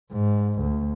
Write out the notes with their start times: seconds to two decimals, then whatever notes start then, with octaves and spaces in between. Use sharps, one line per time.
0.12 G#2
0.60 D2